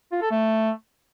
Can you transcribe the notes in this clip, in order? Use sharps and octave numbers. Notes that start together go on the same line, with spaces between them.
F4
A4
A3